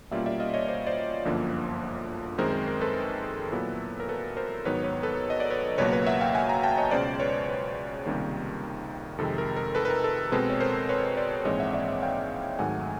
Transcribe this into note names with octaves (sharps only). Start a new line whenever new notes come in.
B2 G3 A#3 C#4 F4 D5 E5
D5 E5
D#5 F5
C#5 D#5
C5 D5
C5 D5
G1 F#2 D3 F3 A#3
F#2 D#3 G#3 C4 A#4 C5
A#4
A#4
A4 B4
A#2 F#3 B3 E4
A#4
A4 B4
A#4 C5
G#2 D#3 F#3 B3 D#4 B4 C#5
B4 C#5
A4 B4
D#5
D5
B4 C#5
C#2 B2 F#3 A#3 B4 C#5
B4 C#5
E5 F#5
F5 G5
F#5 G#5
G#5 A#5
G5 A5
C#5 D#5
C#2 B2 G#3 C#4 C5 D5
B4 C#5
B4 C#5
C#2 C3 D#3 G3 A#3
F2 C3 D#3 G#3 A4
A#4
A#4
A4 B4
B4
A#4
A4
B2 G#3 C4 A4 B4
C#5
A#4 C5
B4 C#5
C5 D5
A#1 G#2 E3 G#3 C4 C#5 D#5
E5 F#5
D5 E5
E5 F#5
F5 G5
G#1 G#2 D#3 F#3 A3 F#5 G#5